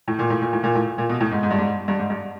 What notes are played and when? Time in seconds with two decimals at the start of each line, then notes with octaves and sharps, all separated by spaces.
0.08 A2
0.19 A#2
0.30 A2
0.42 A#2
0.53 A2
0.64 A#2
0.75 A2
0.98 A#2
1.09 B2
1.21 A2
1.31 G#2
1.43 G#2
1.51 G2
1.58 G#2
1.88 G2
1.99 G#2
2.10 G2